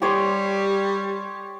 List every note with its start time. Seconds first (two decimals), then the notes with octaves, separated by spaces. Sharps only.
0.02 G3 G4 C#5 C6